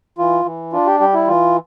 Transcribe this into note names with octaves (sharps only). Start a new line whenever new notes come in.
E3 F4
E3
D4 F4
G4
G3 G4
E4
E3 F4